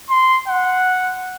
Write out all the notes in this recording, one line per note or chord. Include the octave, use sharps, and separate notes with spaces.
C6
F#5